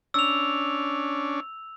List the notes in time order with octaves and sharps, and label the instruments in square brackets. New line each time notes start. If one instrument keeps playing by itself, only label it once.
[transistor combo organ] C#4 D4 [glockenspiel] E6 F7